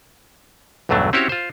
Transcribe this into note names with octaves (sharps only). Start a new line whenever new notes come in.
B1 E2 G2 F#3 A3 D4
C4 C#4 E4 F#4 G4 C#5
F4 C5